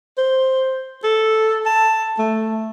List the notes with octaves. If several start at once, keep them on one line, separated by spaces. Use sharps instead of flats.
C5
A4
A5
A3